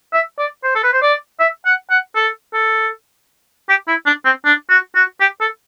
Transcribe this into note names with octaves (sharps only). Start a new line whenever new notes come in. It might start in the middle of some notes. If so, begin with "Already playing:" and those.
E5
D5
C5
A4
B4
C5
D5
E5
F#5
F#5
A4
A4
G4
E4
D4
C4
D4
F#4
F#4
G4
A4